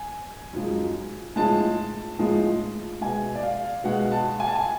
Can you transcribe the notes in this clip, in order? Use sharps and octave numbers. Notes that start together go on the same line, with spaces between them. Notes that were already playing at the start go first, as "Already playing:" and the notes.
Already playing: G#5
F#2 F3 G#3
A2 F3 G#3 A5
A2 F3 G#3
B2 G#3 G#5
D5
F5
B2 G#3 F#5
A5
G#5
A5
G#5